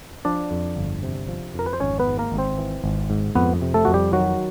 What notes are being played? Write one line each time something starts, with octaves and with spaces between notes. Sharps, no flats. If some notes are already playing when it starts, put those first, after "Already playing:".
F3 D4 D5
F2
G1
C3
F3
F2 A#4
B4
C5
G#1 C#4 C#5
B3 B4
G#2
A#3 A#4
G#1
C4 C5
E3
G#1
G#2
F2 B3 B4
C3
A3 A4
F2 F#4
G3 G4
D#3 F#3 F#4